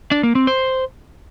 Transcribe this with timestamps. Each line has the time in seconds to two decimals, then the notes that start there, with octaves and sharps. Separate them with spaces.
0.11 D4
0.23 A#3
0.35 C4
0.47 C5